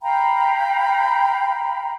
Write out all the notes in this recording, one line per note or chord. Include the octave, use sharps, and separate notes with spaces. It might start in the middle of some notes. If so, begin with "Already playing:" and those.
F5 G5 A#5 B5